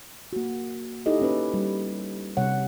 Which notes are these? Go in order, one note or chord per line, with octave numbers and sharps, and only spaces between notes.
A#3 F#4
D#4 E4 G4 A4 D#5
A#3 C#4 B4
G3
C3 G3 C#5 F#5